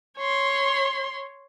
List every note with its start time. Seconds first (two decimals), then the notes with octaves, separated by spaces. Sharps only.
0.18 C#5 C6